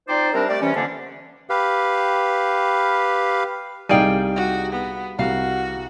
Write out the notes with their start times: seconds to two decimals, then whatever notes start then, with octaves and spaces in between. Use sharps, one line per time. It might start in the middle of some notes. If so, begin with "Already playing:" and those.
0.09 C4 D#4 F4 C5 D5
0.33 C3 G3 C4 D4 A#4
0.48 G3 A3 A#4 D5
0.62 C3 E3 G3 C#4
0.75 F2 D3 A#3 C#4 D4 A5
1.50 G4 B4 F5
3.89 C2 G3 D#4 G#4 D5 F5 G5 D#7
4.36 F#4
4.73 B3
5.19 C2 F#4 F5